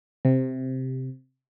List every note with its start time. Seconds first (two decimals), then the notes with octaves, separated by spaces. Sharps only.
0.25 C3